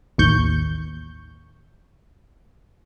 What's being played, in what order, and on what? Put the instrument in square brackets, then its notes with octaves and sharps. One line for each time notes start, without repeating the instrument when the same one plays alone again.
[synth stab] A1 D#2 C#6 G6